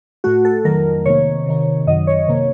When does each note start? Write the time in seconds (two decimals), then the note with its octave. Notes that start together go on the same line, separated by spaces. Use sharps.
0.24 A2 A3 F#4
0.45 A4
0.65 F2 D#3 F#3 A3 A#4
1.06 C3 D#3 A#3 C#5
1.46 C3 D#3 A#3
1.87 F#2 D#3 F#3 D#5
2.07 C#5
2.28 C3 D#3 A#3